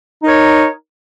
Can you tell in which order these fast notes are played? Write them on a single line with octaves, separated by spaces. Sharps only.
D#4 A#4 C#5